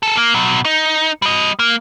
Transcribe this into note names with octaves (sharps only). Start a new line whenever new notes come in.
G#4 A4
A#3
B2 F#3
D#4
G3 D#5
A#3